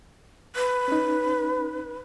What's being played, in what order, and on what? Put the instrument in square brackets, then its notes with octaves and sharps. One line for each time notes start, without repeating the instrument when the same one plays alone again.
[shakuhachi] B4
[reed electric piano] C#4 D#4